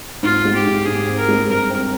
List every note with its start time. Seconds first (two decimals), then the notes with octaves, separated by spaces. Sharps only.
0.23 G#2 F4
0.45 G#3
0.55 G4
0.66 G#2
0.85 G#2 G#4
1.07 C4
1.18 A#4
1.28 G#3
1.49 G2 A#4
1.70 C4